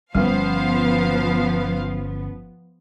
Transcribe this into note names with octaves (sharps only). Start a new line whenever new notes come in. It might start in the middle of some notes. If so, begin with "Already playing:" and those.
G1 F3 G3 B3 C#4 C5 F5